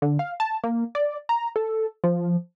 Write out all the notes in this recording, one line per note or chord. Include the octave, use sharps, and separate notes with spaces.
D3
F5
A5
A#3
D5
A#5
A4
F3